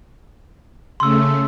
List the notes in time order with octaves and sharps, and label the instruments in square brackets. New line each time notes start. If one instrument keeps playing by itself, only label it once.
[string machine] C#3 A3 [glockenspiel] C6 E6